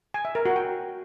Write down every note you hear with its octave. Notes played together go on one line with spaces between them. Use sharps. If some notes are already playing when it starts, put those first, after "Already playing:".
G#5
E5
A#4
F#4
G5